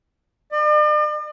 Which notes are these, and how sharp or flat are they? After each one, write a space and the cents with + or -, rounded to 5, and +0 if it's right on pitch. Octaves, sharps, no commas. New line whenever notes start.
D5 +45